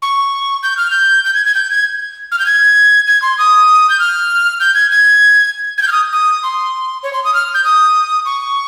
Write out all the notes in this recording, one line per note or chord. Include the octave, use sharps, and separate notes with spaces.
C#6
G6
F6
G6
G6
G#6
G#6
G6
G#6
F6
G6
G#6
G#6
C6
D#6
G6
F6
G6
G#6
G#6
G#6
G6
F6
D#6
D#6
C6
C#5
C6
D#6
F6
G6
D#6
C#6